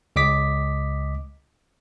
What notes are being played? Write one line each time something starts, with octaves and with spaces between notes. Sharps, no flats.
C#2 D#5 D6 B6